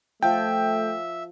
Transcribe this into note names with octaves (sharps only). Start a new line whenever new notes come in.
F3 A3 A4 E5 G5